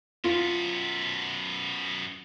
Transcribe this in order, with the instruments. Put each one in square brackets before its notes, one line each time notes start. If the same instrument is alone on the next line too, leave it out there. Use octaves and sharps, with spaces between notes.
[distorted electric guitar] F#2 B3 [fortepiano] F4